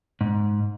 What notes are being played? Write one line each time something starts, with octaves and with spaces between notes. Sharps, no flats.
G#2